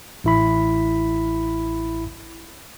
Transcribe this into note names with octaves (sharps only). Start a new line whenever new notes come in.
A1 E4 B5